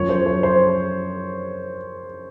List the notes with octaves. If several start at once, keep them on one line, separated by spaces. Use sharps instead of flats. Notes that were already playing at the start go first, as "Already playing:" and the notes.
Already playing: F#2 F3 C#5
C5
C5
C5